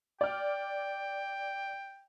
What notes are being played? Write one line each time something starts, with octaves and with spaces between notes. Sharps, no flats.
D5 G5 F6